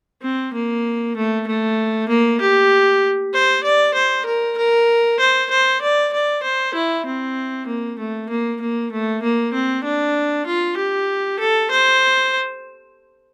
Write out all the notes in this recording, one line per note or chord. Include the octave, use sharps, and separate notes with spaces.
C4
A#3
A3
A3
A#3
G4
C5
D5
C5
A#4
A#4
C5
C5
D5
D5
C5
E4
C4
A#3
A3
A#3
A#3
A3
A#3
C4
D4
F4
G4
A4
C5